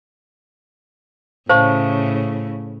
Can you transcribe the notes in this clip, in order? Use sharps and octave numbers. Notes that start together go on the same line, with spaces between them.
A2 C#3 C5 F5 A5 C#6